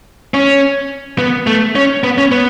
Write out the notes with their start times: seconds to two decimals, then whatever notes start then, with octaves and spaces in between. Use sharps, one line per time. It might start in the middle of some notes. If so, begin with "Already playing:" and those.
0.34 C#4
1.18 B3
1.47 A3
1.75 C#4
2.04 B3
2.18 C#4
2.31 B3